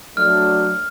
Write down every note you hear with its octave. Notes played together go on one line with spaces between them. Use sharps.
F#3 A3 D4 F6